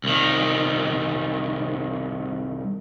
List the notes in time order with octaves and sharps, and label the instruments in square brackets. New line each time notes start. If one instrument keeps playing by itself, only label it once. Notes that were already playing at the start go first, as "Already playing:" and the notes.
[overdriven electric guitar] C2 D#3